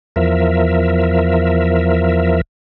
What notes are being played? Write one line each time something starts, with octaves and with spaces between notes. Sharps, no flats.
E2 F3 A#4 E5